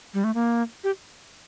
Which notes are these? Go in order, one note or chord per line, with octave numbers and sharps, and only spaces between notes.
G3
A3
A#3
G4